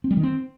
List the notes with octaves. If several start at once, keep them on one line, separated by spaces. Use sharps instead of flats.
C4
G3
D#3
C4